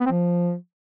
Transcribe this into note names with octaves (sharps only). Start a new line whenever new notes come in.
B3
C4
F3